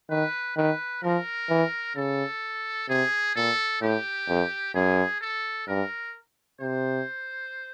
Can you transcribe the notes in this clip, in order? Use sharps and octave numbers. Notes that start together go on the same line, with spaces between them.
D#3 B4
D#3 B4
F3 A#4
E3
C#3 A4
C3 G#4
A#2 A4
A2 G4
F2
F#2 G#4
A4
G2 A#4
C3 C5